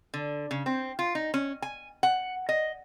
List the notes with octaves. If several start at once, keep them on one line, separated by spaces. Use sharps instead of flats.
D3
C#3
C4
F4
D#4
C#4
G#5
F#5
D#5